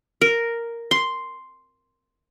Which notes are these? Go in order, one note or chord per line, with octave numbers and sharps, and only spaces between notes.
A#4
C6